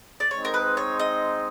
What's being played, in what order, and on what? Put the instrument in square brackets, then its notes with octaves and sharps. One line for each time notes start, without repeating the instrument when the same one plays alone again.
[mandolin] D5
[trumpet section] G#3 C4 D#4 [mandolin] C#5
[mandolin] A#4
B4
C#5
D#5